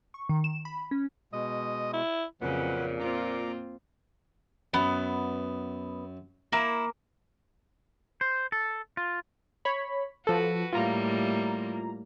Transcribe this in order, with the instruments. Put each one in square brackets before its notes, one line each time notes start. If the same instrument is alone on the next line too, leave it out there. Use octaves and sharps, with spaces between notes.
[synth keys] C#6
D#3
E7
B5
C#4
[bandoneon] B2 G#3 [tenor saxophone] D#5
[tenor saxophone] E4
[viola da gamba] F2 C#3 C#4 [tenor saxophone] A#2 [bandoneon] F#3 B4 F#5
[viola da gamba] A#3 C4 F4 [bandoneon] A#5 D6
[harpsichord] F#2 [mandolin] B3
[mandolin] A#3 [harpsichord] E4
[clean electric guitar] C5
A4
F4
[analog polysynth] C#5 B5
[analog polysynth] F3 A4 [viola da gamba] F#4 B4
[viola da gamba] A2 G3 A#3 [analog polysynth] F4 A#5